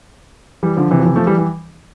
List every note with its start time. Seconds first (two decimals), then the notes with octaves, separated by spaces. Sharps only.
0.63 E3 G3
0.77 D3 F3
0.91 C3 E3
1.00 F3
1.05 C3 E3
1.16 F3 A3
1.27 E3 G3
1.37 E3 G3